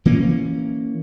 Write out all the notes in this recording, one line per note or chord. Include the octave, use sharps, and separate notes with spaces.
E3 A#3 C#4